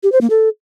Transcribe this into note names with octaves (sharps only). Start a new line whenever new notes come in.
G4
C5
A#3
A4